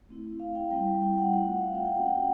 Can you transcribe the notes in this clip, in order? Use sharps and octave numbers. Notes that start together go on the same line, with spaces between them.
A3 C4 E4
F5
G5
G3 C4 E4 G5
G5
G5
F#5
A3 C4 F4 F#5
F5
F#5
G5
G5
A#3 C#4 F#4 F#5
G5
F#5